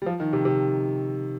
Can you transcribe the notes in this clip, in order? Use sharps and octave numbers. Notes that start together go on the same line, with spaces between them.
G3
F3
D#3
C3
C3